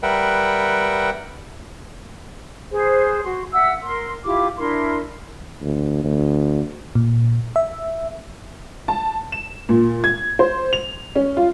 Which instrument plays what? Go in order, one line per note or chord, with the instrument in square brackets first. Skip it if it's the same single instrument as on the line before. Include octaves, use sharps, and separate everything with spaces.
[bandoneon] G3 A#4 B4 E5 F#5 G5
[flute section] G#4 B4 C5
F#4 C6
E5 F#5 E6
A#4 C6
E4 F4 G4 D6
D4 E4 A#4 C6
[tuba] D2
D2
[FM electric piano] A#2
E5
[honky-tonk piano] A5
E7
A#2
G#6
C5
F7
C#4
F4